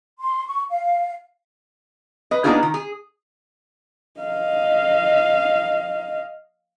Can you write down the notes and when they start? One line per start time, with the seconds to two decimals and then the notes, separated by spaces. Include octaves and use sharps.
0.19 C6
0.46 C#6
0.69 F5
2.31 B4 D#5
2.44 A#3 B3 D4 D#4 F4 G#4
2.63 D#3
2.74 G#4
4.21 D#5 F5